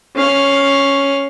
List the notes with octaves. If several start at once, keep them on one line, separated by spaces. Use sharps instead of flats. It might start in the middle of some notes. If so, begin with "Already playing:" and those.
C#4 F5